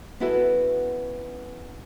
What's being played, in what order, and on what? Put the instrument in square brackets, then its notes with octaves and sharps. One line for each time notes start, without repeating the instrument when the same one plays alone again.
[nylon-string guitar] B3 C#4 E4 F#4 A4 B4